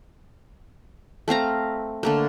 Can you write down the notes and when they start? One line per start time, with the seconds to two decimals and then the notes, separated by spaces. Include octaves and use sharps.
1.28 A3 C4 F5 A#5
2.03 D3 A3 A#3